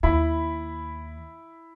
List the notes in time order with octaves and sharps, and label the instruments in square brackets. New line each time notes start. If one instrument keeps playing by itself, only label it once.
[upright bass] D#2 [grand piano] E4 B5